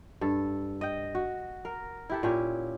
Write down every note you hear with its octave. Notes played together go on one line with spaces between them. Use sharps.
G2 A4
D#5 G5
F#4
A#4
E4 G4 A4
A#2 C#4 G4